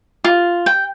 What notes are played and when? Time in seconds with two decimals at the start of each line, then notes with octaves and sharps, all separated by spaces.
0.24 F4
0.66 G5